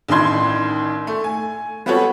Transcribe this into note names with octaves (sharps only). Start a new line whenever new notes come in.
A1 D#3 D4 E4 C6 G#6
A3
G#5
G3 B3 C4 F#4 A4 C#5